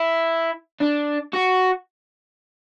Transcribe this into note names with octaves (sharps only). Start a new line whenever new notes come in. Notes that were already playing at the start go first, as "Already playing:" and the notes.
Already playing: E4
D4
F#4